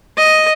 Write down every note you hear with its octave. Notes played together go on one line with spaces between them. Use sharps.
D#5